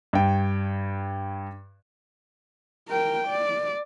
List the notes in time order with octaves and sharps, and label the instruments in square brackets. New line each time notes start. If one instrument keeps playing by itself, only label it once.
[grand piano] G2 G5
[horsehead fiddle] A#4 G5
D5